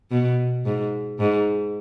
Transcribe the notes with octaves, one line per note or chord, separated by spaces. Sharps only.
B2
G#2
G#2